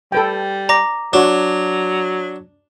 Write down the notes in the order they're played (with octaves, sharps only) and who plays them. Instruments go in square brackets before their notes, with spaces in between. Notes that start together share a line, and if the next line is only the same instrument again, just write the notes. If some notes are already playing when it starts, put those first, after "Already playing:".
[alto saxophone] G3 [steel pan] A4 B4 G5
[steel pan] D5 [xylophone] A#5 D6 A#6
[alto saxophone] F#3 [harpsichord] D4 [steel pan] F#4 C#5